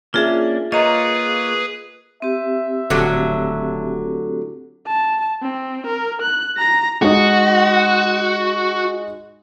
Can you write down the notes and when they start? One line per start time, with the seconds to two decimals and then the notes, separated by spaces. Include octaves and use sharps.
0.14 A#3 C#4 D4 F4 G#4 E5
0.72 A#3 F4 G#4 B4 C#5 D#5 A#5
2.22 C4 G4 E5
2.90 D#1 A2 D3 F#3
4.87 A5
5.42 C4
5.87 A#4
6.22 F#6
6.57 A#5 A#6
7.02 G#3 D#4 F#4